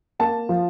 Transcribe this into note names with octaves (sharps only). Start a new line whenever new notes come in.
A#3 A5
F3